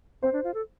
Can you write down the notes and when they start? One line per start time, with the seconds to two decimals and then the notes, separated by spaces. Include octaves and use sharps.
0.22 C4 C5
0.33 D4
0.44 F4
0.54 A4